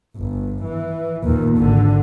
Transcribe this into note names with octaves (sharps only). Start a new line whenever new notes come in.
G1
E3
D#2 A#2
G#1 D3